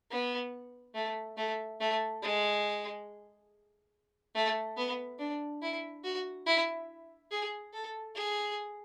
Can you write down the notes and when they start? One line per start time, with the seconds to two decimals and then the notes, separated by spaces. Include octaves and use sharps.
0.11 B3
0.94 A3
1.37 A3
1.80 A3
2.23 G#3
4.35 A3
4.77 B3
5.19 D4
5.62 E4
6.04 F#4
6.46 E4
7.32 G#4
7.73 A4
8.15 G#4